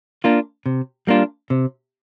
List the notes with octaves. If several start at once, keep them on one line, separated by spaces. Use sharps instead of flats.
A#3 D4 F4
C3
G3 A#3 D4 F4
C3